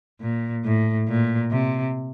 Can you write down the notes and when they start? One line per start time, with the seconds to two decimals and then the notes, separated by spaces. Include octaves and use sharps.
0.21 A#2
0.64 A2
1.08 A#2
1.52 C3